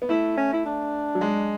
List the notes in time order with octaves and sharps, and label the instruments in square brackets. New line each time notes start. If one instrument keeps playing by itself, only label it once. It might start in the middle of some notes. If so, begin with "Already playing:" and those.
[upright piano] B3
[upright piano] A3 [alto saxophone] E4
[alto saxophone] C#4
E4
D4
[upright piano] F#3
G#3